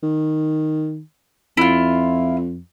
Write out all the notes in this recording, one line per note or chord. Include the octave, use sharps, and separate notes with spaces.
D#3
F2 E4 F4